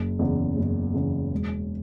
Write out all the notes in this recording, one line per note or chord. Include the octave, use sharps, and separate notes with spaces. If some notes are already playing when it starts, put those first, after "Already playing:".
Already playing: F#1
E2 C#3
F#1
E2 C#3
E1